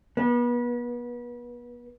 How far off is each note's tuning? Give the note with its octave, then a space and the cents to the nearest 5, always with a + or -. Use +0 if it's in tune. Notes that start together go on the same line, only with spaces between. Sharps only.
B3 -35